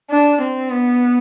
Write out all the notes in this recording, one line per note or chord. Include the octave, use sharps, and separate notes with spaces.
D4
C4
B3